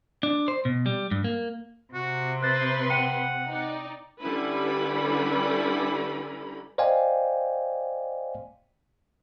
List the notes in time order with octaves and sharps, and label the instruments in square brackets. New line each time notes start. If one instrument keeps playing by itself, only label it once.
[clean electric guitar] D4
C5
B2
G3
G2
A#3
[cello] C3 [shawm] F#4
[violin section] B4 C6 [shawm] C5 [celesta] F#6 A6 A#6
[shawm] F#5 [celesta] G5 C#7 D#7
[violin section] D#4 D5
[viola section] D3 G3 C#4 E4 B4 B5
[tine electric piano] C5 D5 D#5 F5 G5 G#5